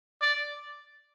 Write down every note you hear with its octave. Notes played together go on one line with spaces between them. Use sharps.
D5